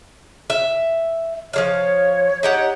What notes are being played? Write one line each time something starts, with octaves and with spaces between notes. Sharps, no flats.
E5
F3 F#3 C#5 F5
D#4 G4 F#5